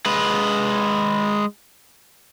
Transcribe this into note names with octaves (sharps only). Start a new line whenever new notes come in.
G#3 B4